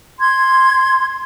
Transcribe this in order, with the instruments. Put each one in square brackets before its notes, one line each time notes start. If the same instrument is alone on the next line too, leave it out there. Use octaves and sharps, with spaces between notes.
[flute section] C6 G#6